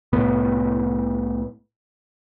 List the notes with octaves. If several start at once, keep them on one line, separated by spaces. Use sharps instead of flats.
C2 A2 C3 B3